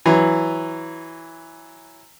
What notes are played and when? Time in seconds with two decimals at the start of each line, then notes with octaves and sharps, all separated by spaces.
0.06 E3 F#3